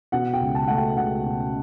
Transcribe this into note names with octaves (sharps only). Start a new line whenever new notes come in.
B2 F#5
G5
C#2
A5
A3 F#5
G5
C#2 F#5
B2